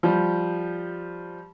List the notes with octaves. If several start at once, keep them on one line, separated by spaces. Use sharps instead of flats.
F3 G3